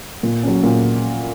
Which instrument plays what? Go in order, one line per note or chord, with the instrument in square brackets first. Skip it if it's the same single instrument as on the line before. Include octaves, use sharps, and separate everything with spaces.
[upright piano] A#2
F#3 C#4
A#2